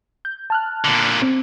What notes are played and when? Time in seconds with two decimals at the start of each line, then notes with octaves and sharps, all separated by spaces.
0.25 G6
0.50 A5 F6 F#6
0.84 A#2 D3
1.22 C4